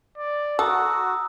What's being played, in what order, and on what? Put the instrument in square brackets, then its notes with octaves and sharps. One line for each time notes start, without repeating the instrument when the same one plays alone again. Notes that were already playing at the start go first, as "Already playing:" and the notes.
[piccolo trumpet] D5
[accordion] F#4 [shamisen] A4 [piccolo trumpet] F#5 [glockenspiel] A#5 D#6 E6